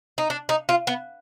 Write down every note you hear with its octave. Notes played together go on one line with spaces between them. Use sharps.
D#4
D4
D#4
F4
B3